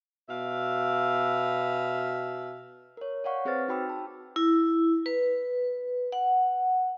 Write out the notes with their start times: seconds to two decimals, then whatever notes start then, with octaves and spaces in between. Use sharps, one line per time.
0.29 B2 E5 F5
2.97 A#4 C#5
3.24 C#5 D5 F5 F#5 C#6
3.45 C4 G#4 B4 C5 F6 A6
3.68 D#4 F#4 G5 B5 D6 E6
3.89 A5
4.36 E4
5.06 B4
6.12 F#5